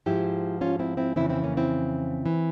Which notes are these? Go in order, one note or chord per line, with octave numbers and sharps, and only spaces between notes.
G#2 F3 E4 G4
C#4 F4
C4 E4
C4 E4
F2 C#3 E3 C4 E4
C4 E4
A#3 C#4
C4 E4
E3